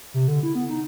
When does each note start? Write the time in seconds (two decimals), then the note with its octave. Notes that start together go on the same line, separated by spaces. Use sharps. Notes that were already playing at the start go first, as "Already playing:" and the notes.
0.14 C3
0.28 D3
0.43 E4
0.55 B3
0.69 D#4